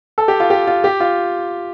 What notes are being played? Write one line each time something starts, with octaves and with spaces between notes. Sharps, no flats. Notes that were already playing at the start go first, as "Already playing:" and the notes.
A4
G4
F4
G4
F4
G4
F4